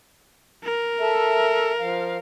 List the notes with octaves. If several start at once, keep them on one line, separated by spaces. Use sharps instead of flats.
A#4
A4 E5
F3 F5